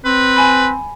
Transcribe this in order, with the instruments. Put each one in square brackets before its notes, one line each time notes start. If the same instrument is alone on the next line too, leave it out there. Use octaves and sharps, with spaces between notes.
[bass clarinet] C4 [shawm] B4
[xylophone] G#5 B5